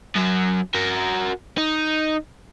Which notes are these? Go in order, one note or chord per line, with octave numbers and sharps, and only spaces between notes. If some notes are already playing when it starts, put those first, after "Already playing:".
F#2 F#3
F#4 A#4
D#4